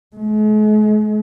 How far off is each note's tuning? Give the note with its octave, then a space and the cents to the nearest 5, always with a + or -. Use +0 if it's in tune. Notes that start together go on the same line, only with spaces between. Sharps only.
G#3 +45